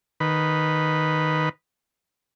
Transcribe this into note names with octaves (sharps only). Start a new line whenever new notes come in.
D#3 B4